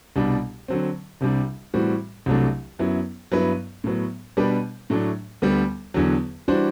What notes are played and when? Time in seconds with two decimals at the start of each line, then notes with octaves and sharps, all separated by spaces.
0.16 C2 B2 G3 D4
0.68 D3 F#3 C4
1.21 C2 C3 G3 D4
1.74 A2 E3 G3 C4 F#4
2.26 C2 C3 F#3 A3 D4
2.79 F#2 F#3 B3 E4
3.32 G2 F#3 B3 E4 B4
3.84 A2 F#3 B3
4.37 B2 G3 D4 G4 B4
4.90 A2 F#3 A3 D4
5.42 D2 D3 G3 B3
5.94 E2 D3 F#3
6.48 E3 G3 D4 F#4 C5